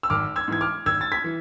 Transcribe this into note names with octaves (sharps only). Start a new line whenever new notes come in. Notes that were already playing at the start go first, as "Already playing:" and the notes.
E6
G#1 D6 F6
E6 G#6
G#2 E3 G#6
D6 F6
G#1 E6 G#6
A6
G#6 B6
E3